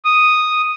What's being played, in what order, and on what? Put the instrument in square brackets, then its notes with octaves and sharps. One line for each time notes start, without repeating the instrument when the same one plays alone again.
[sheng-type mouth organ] D#6